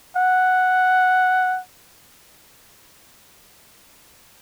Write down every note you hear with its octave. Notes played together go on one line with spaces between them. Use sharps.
F#5